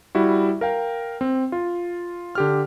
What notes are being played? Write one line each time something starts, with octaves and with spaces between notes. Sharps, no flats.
G3 E4 F#4
A#4 F5 G5
C4
F4
D3 G4 F6